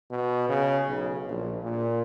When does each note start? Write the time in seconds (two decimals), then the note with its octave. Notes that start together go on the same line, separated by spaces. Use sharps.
0.10 B2
0.49 C#3
0.88 B1
1.29 A#1
1.63 A#2